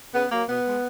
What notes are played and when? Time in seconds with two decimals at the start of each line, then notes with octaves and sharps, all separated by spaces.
0.14 C#3 B3
0.31 F#3 A#3
0.48 B2 B3
0.66 G#3